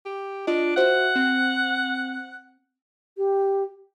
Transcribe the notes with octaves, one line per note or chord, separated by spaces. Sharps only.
G4
D4 F4 D#5
F#4 C5 E5 F#5
C4
G4